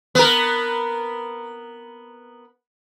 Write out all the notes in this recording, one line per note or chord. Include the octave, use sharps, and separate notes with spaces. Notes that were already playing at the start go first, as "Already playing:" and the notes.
B3 A#4